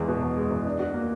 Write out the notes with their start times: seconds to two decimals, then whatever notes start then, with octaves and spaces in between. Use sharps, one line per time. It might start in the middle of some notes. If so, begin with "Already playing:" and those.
Already playing: E2 G#3
0.08 B2
0.22 E2
0.36 G#3
0.51 E2
0.66 D4
0.79 F#4
0.94 A#3